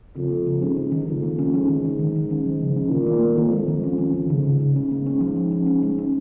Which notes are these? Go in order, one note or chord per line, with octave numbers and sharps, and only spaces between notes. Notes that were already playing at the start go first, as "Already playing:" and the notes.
F2 C#3
A#3
C#3
G#2 C#4
C#4
D#3
F2 C#3
A#3
C#4
G#2 C#4
D#3
D#3
D#3
D#3
C#4
F3
C#3
C#4
A#2 D#3
A#3
A#3
F2 D#3
G#3
D#3
C#4
C#4
D#3
G#2 C#3
C#3
C#3
G#2 C#4
A#3
C#4
F3
C#4
C#4
C#4
G#3
C#4